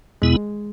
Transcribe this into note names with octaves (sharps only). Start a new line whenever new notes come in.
E2 B2 G#3 B3 E4